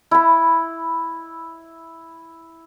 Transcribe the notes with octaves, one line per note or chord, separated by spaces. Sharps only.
E4 B5